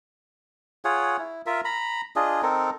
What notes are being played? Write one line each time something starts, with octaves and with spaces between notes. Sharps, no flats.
F4 G#4 C#5 F#5
E4
F4 A#4 E5
A#5 B5
D4 F4 G#4 D#5
C4 D#4 A4 A#4